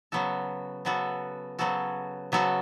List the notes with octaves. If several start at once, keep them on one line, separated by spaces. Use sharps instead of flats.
C#3 F#3 B3 F#4 A4
C#3 F#3 B3 F#4 A4
C#3 F#3 B3 F#4 A4
C#3 F#3 B3 F#4 A4